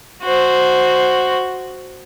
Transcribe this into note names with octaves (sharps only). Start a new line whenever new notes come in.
F#4 C5